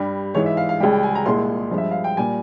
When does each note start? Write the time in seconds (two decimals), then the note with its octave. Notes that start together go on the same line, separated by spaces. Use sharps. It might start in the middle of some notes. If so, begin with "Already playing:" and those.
Already playing: G2 G3
0.34 G#2 E3 G#3 C#5
0.46 E5
0.57 F5
0.69 F5
0.80 C#2 C#3 G3 G5
0.92 G5
1.03 G#5
1.15 A#5
1.26 C2 A#2 G#3 C6
1.71 G2 F3 G#3
1.78 E5
1.91 F5
2.04 G5
2.17 A#2 G3 G#5